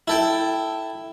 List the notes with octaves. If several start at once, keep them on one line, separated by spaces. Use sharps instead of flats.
E4 A4 G5